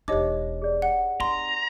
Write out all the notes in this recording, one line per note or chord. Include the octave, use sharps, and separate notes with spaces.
E1 D4 D#4 G4 C5 C#5 D#5 D6
G#4 D5
F#5
C4 D#4 A#5 C6